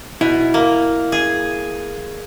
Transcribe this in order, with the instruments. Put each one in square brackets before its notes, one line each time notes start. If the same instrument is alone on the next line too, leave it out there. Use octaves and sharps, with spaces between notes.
[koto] B2 [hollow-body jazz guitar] E4
[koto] A#3
G#4